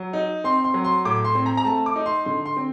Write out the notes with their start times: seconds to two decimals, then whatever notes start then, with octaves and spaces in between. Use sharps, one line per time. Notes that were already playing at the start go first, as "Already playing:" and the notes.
Already playing: F#3
0.13 D#4
0.44 C4 C6
0.64 C6
0.74 F#3
0.84 C6
1.05 A2 D6
1.25 C6
1.35 C4
1.46 A#5
1.57 A#5
1.65 A3 A5
1.86 D6
1.96 D#4
2.06 C6
2.25 D3 C6
2.46 C6
2.57 C4